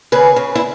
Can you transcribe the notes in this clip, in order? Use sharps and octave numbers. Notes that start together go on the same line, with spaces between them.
C#3 G#4 B4
C#3
E4